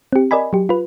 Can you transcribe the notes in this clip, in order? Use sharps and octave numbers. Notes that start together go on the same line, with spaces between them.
C4 G4
A#4 D5 D#5 G#5 B5
F#3 G4
F4 B4